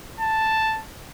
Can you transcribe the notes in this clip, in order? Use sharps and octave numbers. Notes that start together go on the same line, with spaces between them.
A5